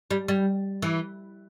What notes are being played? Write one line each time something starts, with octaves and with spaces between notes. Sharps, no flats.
G3
G3
E3